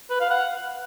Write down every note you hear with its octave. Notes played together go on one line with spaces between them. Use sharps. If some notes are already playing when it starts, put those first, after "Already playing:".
B4
F5
F#5